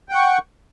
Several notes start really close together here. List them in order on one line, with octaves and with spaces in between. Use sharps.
G5 F#5 C#6